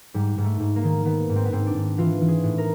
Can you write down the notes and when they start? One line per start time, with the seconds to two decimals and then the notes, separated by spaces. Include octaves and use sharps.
0.14 G#2 G3
0.38 G#2
0.44 A3
0.60 G#2
0.76 A#3
0.83 D#3
1.05 D#3 B3
1.29 G#2
1.36 C4
1.45 B3
1.52 G#2 C4
1.66 D4
1.74 G#2
1.98 E3 F4
2.21 E3
2.28 G#4
2.44 A2
2.58 A#4